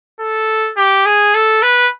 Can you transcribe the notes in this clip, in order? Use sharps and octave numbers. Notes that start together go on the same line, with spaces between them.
A4
G4
G#4
A4
B4